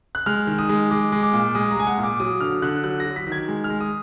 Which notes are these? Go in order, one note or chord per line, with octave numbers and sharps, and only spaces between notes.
F#6
G#3 F6
D#3
D#6
G#3
G#3 D6
G#3
D6
A#2
G#3 D#6
A#5
G#3 G#5
F#5
A#2
D6
F#3 D#6
D3 F6
D3 F#6
F#3 F#6
A#6
F#3
B6
D#3
G#6
G#3
F6
G#3
D#6